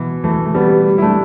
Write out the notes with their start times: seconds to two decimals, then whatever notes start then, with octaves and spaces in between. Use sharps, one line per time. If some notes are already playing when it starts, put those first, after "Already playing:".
Already playing: B2 E3
0.24 E3 A3
0.46 A3
0.55 G3 B3
0.98 E4
1.02 A3 D4